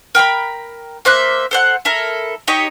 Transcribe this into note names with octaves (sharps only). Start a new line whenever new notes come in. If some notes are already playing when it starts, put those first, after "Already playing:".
A#4 G5 A#5 B5
A#3 C5 E5 F#6
A4 C5 F#5
E4 A4 A#4
D#4 G4 C#5 D#5